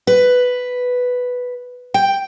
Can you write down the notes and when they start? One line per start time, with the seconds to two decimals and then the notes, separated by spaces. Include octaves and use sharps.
0.07 B4
1.94 G5